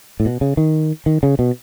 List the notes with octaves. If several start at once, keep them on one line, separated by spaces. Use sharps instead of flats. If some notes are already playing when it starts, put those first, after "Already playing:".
A2
B2
C#3
D#3
D#3
C#3
B2